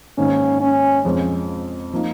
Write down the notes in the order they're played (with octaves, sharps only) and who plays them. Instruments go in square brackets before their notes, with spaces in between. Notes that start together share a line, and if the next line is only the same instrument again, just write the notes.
[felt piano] G#2 D#3 A#3 [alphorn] C#4
[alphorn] C#4
[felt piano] F2 F3 G#3 C#4 F4
F3 A#3 D#4